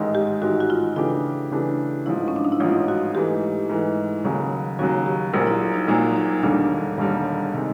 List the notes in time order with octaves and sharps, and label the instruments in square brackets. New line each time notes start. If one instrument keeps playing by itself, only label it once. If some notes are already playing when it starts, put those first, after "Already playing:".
Already playing: [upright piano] A1 G#2 D#3 G#3
[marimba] G4
[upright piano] A1 G#2 D#3 G#3 [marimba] F#4
[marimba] F#4
F4
[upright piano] C#3 E3 A3 D4 G4 [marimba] F4
[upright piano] C#3 E3 A3 D4 G4
[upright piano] A1 G#2 F3 [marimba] E4
[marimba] C#4
D4
D#4
E4
[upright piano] A1 G#2 F3 [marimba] F4
[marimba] F#4
[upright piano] G#2 E3 A3 [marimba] G4
[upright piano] G#2 E3 A3
D#2 C#3 F#3
[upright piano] D#2 C#3 F#3 [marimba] F#4
[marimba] G4
[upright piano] A#1 A#2 F#3 A#3 [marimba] F#4
[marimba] E4
D#4
[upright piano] A#1 A#2 F#3 A#3 [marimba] D#4
[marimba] D#4
[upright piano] E1 D#2 D3 G3 [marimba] D4
[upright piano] E1 D#2 D3 G3
C3 D#3 G#3